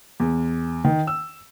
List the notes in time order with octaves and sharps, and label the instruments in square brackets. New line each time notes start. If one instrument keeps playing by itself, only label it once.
[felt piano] E2
D#3
E6